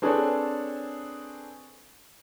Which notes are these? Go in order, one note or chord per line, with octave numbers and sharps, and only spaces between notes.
C4 D4 G#4 A4 B4 C#5